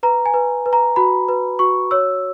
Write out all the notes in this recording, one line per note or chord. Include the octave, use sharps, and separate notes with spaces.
B4 A#5
G#5
B4
B4
A#5
F#4 B5
B4
F#4 C#6
C#5 E6